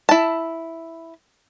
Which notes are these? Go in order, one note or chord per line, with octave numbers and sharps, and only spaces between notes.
E4 A5